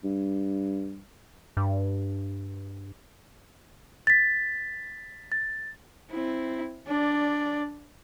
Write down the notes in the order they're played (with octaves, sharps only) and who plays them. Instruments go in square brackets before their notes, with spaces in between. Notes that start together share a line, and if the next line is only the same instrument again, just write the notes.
[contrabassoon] G2
[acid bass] G2
[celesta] A6 B6
A6
[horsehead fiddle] C4 E4
D4 D5